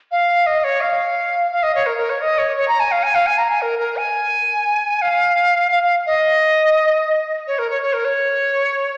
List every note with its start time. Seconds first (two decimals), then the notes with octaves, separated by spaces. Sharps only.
0.11 F5
0.46 D#5
0.64 C#5
0.81 F5
1.51 F5
1.63 D#5
1.75 C#5
1.86 A#4
1.98 A#4
2.10 C#5
2.21 D#5
2.38 C#5
2.56 C#5
2.68 A#5
2.80 G#5
2.91 F5
3.03 G#5
3.15 F5
3.26 G#5
3.38 A#5
3.50 G#5
3.61 A#4
3.79 A#4
3.97 G#5
5.01 F5
5.71 F5
5.83 F5
6.06 D#5
7.47 C#5
7.58 A#4
7.70 C#5
7.82 C#5
7.93 A#4
8.05 C#5